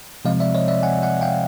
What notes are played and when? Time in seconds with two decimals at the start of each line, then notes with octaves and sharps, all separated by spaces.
0.25 C3 F3 G#3 C4 D#5 F5
0.40 D5 E5
0.55 C#5 D#5
0.68 D5 E5
0.83 F#5 G#5
1.02 E5 F#5
1.21 F5 G5